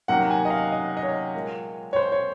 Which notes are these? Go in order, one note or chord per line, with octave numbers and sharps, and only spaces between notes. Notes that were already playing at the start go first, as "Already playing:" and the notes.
C3 D#3 F#3 A#3 F#5
G#5
D#5
F5
D#5
D#5
C#5
A#2 G#3
C#5
C5
C#5